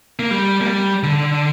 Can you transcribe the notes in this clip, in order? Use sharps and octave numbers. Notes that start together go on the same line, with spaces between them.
A#3
G3
A#3
G3
D3